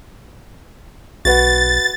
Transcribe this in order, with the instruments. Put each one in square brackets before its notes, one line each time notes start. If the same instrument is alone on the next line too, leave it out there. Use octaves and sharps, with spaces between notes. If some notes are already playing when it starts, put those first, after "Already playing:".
[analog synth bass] B1 [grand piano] F#4 B4 F#5 [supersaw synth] A6